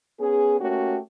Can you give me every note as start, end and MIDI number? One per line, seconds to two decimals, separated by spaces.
0.19 0.58 59
0.19 0.58 61
0.19 0.58 68
0.61 0.97 57
0.61 0.97 58
0.61 0.97 61
0.61 0.97 66
0.61 0.97 67